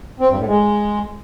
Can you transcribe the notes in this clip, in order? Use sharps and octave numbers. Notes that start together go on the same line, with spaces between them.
C4
G2
A2
G#3